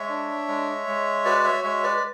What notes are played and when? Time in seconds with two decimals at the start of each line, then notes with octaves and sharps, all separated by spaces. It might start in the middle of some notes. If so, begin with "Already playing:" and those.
Already playing: G#3 C#5 E5
0.09 D4
0.48 G#3
0.87 G#3
1.25 F#4 B4 D5
1.44 C#5 E5
1.64 G#3 C#5 E5
1.83 B4 D5
1.97 B4